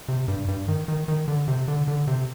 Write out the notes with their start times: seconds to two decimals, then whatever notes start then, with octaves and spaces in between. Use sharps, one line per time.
0.08 C3
0.28 G2
0.48 G2
0.68 D#3
0.88 D#3
1.08 D#3
1.28 D3
1.48 C3
1.68 D3
1.88 D3
2.07 C3